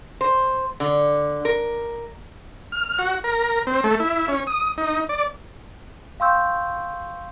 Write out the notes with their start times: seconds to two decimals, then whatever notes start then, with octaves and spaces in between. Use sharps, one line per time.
0.21 C5
0.80 D3
1.45 A#4
2.72 F6
2.99 F#4
3.24 A#4
3.67 C4
3.84 A3
4.00 E4
4.28 C#4
4.47 D#6
4.78 D#4
5.09 D5
6.20 F5 G5 C6 C#6 E6 G6